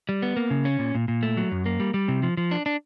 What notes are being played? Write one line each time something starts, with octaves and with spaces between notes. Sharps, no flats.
G3
B3
A#3
C#3
C#4
A#2
A#2
A#2
A3
F#3
F#2
A#3
G3
G3
C3
F3
F3
D4
D4